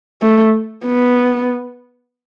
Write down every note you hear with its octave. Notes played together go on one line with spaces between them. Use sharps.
A3
B3